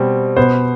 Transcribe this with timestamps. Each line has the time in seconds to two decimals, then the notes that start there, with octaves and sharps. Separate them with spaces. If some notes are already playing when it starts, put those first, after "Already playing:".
Already playing: B2 G3 C4
0.36 B2 B3 C5